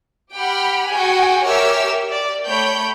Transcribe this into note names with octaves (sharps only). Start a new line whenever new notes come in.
G4 F#5 G5 B5 F6
F#4 G#4 G5 G#5
G4 A#4 C#5 E5 E6 F6
D5
A3 C#5 G5 B5 G6